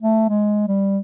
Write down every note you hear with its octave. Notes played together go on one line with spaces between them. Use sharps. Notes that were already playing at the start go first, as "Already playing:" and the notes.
A3
G#3
G3